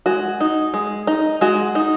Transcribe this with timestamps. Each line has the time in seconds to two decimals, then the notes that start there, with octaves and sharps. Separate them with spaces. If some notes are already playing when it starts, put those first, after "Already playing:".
0.06 G#3 F#4
0.41 D#4
0.74 G#3
1.07 D#4
1.41 G#3 F#4
1.75 D#4